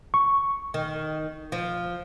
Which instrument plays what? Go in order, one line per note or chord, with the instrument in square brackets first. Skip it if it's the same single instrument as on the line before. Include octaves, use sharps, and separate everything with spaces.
[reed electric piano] C#6
[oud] D#3
F3